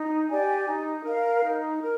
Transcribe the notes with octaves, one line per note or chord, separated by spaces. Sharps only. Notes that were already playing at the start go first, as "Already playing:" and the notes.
Already playing: D#4
G4 D5 G#5
D#4
A#4 F5
D#4
A#4